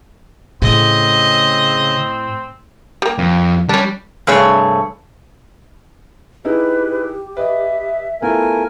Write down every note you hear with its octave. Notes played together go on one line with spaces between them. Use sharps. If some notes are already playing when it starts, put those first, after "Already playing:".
A2 C#3 C4 D#5
G3 A#3
F2
G3 C#4 D4
G2 C3 A3 G#4 C#5
D#4 E4 G4 G#4 B4
B4 D#5 E5
A3 B3 E4 F4 A#4 G#5